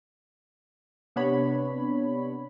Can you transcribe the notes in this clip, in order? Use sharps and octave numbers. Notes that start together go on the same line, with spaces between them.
C3 B3 D4 C#5 B5